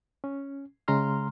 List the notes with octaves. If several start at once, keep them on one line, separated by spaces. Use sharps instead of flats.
C#4
C#3 G#3 A#5 C6 F6